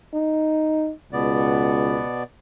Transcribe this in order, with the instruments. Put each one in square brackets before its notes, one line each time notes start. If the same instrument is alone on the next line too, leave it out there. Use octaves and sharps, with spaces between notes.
[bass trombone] D#4
[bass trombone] C#2 [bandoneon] B2 B3 D5